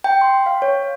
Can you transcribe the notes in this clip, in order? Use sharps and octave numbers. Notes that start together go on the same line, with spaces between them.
G5
C6
F5
C#5